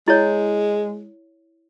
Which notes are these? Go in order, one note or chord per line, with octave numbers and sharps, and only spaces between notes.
G#3 E4 C#5